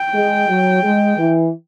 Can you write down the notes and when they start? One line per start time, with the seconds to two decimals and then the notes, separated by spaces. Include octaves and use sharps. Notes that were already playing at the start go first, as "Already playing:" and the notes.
Already playing: G5
0.14 G#3
0.49 F#3
0.83 G#3
1.17 E3